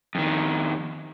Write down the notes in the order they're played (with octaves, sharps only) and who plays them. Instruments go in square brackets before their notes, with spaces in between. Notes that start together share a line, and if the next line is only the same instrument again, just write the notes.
[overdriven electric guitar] F2 D#3